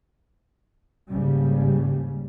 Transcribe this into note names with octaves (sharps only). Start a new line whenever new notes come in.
G#1 D#2 C#3 G3